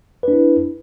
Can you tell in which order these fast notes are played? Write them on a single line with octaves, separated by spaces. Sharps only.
B4 D4 E4